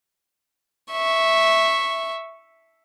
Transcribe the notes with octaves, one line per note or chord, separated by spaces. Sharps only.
E5 C#6